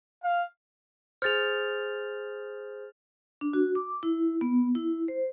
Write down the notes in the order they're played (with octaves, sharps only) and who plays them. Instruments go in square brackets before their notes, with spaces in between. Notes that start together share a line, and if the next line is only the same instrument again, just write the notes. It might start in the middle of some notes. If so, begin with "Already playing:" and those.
[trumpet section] F5
[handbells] G#4 C5 [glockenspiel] F6 A6 F7
[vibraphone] D4
F#4
D6
E4
B3
E4
C5